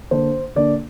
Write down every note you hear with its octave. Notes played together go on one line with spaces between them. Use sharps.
D3 A#3 D4 C5
D3 A#3 D4 D5